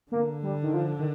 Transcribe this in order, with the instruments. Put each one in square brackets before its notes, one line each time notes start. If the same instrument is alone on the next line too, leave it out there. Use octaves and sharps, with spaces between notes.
[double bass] D3 [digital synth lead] A#3
[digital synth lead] G3
D#3
F3
D#3